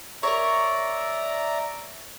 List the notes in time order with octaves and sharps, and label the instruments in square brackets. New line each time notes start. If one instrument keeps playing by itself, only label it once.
[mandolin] A#4 C#5 [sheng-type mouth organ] D5 E5 A#5